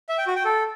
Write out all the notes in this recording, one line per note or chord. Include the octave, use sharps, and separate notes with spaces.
E5
G5
F#4
G5
A4